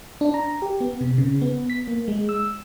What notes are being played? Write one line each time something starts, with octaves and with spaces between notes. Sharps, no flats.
D4
A#5
G4
B3
C3
C#3
B3
B6
A#3
G#3
E6